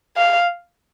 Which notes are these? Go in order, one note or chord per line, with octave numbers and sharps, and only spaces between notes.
F5